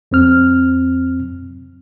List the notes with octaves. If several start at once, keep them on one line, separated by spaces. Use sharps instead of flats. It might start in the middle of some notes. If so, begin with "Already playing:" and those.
F2 C4 F6